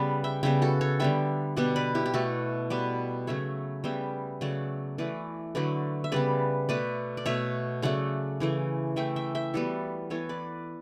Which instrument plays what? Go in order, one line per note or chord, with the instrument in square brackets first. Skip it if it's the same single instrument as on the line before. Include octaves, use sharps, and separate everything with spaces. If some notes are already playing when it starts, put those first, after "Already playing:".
Already playing: [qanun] C#3 G3 B3 B4 D5
E5 G5
C#3 G3 B3 E5 G5
F#4 A4
A4 C#5
D3 G3 B3 E5 G5
B2 G3 B3 D5 F#5
B4 D5
E4 G4
G4
B2 A3 F#4 A4
B2 G3 B3 B4 D5
C#3 F#3 A3 C#5 E5
C#3 G3 B3 E5 G5
C#3 F#3 A3 D5 F#5
E3 A3 B4 D5
D3 F#3 A3 B4 D5
E5
C#3 G3 B3 B4 D5
B2 A3 B4 D5
D5
B2 A3 C#5 E5
C#3 F#3 A3 D5 F#5
C#3 E3 A3
E3 A3 E5 G5
E5 G5
E5 G5
E3 G3 B3 F#4 A4
E3 B3 A4 C#5
B4 D5